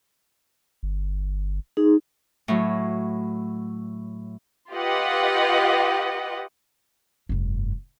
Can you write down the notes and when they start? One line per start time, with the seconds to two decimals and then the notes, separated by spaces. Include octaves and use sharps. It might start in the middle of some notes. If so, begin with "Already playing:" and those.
0.83 G1
1.77 D#4 G#4
2.48 A2 F#3
4.72 F4 G4 B4 D#5 F#5
7.29 F1 G2